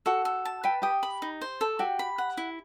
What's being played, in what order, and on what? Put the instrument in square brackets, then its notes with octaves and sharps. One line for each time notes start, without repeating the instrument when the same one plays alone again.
[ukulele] F#4 F#5 [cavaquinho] A4
[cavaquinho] A4
A5
[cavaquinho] B4 [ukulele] G5
[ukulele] G4 G5 [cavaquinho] D#6
[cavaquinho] B5
D#4
C5
A4
[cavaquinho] F#4 [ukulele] G4 G5
[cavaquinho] B5
F#5
E4